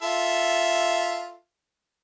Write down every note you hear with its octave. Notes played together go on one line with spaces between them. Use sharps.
F4 A4 E5